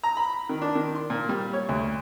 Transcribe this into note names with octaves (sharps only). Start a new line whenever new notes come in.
A#5
B5
D#3
D4
D#3
C6
A#2
G3
C#5
D2